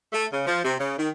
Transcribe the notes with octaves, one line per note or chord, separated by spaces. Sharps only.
A3
C#3
F3
C3
C#3
D#3